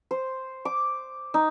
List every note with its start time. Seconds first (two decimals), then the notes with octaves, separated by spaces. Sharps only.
0.11 C5
0.65 D6
1.34 D#4